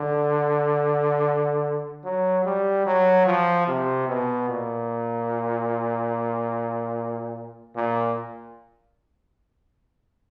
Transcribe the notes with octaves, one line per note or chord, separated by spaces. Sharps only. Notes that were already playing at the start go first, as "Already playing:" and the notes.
Already playing: D3
F#3
G3
F#3
F3
C3
B2
A#2
A#2